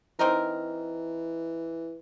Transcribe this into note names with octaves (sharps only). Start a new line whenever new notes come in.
E3 C4 D#4 A#4